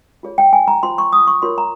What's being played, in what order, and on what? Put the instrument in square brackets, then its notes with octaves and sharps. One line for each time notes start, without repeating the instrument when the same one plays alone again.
[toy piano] F4 G#4 C#5
G5
G#5
A#5
F4 C5 C6
C#6
D#6
C#6
F4 A#4 C#5 C6
A#5